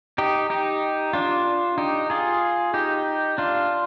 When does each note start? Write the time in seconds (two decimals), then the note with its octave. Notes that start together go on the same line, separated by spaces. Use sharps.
0.18 D#4 G4
0.50 D#4 G4
1.13 D4 F4
1.78 D#4 G4
2.10 F4 G#4
2.74 D#4 G4
3.38 D4 F4